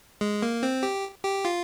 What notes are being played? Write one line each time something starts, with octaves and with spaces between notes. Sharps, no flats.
G#3
A#3
C4
G4
G4
F4